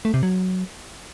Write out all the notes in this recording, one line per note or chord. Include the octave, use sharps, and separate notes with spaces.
A3
C3
F#3